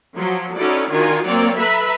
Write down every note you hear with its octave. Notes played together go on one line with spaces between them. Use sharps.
F3 F#3
C#4 D#4 E4 F#4 A4 D5
D#3 D4 F4 F#4 A#4 G#5
F#3 A#3 C4 C#5 D5
A4 B4 E5 A#5 B5